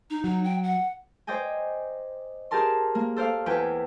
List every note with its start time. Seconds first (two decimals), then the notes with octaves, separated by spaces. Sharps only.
0.10 D#4
0.24 F#3 D#4
0.44 G5
0.63 F#5
1.27 C5 D5 D#5 G5 G#5
2.51 G4 G#4 A#4 A5 C6
2.95 A#3
3.16 A4 C5 D5 F5
3.46 E2 B4 G5 G#5